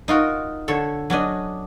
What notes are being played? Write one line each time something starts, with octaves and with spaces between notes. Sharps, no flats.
D#4 F4 F#4 A#4
D3 A4 C#5
F#3 C#4 D4 D#5